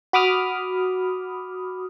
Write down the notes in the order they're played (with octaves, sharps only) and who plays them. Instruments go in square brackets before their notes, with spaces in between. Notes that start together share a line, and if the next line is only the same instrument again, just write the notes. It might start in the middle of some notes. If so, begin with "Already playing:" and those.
[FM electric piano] F#4 B5 D6 D#6 F6